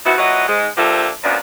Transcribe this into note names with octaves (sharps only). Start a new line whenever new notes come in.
C3 B3 D#4 E4 F#4
A#2 F#3 E4 B4 D#5 F#5
G#2 G#3
F3 A#3 D4 G4 A4 E5
F#2 A#2 F3 B3 D4